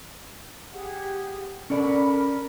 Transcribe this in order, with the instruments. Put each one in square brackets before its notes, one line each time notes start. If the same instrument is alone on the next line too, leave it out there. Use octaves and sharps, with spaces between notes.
[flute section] G4 G#4 F#5
[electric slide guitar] C#4 A4 D5 [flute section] A#4 B5